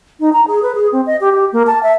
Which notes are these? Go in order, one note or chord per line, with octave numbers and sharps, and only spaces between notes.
D#4
A#5
G#4
B4
G#4
C4
D#5
G4
G4
A#3
A5
E5